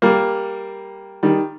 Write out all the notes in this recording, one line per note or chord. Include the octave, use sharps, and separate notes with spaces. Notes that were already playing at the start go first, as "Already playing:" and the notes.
G3 A#3
D#3 G3